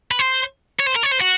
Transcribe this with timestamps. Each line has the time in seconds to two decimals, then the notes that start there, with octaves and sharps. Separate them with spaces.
0.11 B4
0.19 C5
0.80 C#5
0.87 C5
0.96 A#4
1.03 C#5
1.12 C5
1.21 F#4